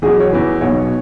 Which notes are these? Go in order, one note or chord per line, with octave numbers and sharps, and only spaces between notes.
E2 B2 F#3 G#4
C#5
E2 E3 B4
B1 B2 F#3 C#5